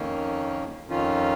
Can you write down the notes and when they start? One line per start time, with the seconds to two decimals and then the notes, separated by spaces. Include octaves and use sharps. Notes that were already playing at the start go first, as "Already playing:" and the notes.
Already playing: F2 D#3 A#3 C#4
0.86 F2 D#3 C#4 F4